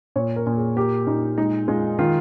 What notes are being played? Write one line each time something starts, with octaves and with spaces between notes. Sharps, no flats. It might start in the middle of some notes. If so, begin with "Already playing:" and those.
A#2 C#5
A#4
A#2
G#4
A#3 G4
A#2 D#4
G#3 D#4
G#3 F4
D#3 F4